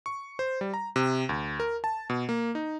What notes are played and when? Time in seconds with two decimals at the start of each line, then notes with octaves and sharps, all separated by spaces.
0.06 C#6
0.39 C5
0.61 G3
0.74 A#5
0.96 C3
1.29 D2
1.60 A#4
1.84 A5
2.10 B2
2.29 A#3
2.55 D#4